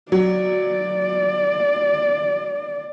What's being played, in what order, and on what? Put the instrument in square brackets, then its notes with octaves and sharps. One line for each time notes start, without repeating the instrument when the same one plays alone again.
[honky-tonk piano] F#3 [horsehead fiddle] D5